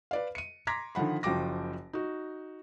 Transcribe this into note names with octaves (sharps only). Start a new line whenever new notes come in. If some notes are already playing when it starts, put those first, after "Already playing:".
B4 D5 F5
C#7 D#7
A#5 C6 D6 G#6 A#6 B6
D3 D#3 F3 F#5 B5
F#1 F3 F#4 G5 D6 A#6
D#4 F#4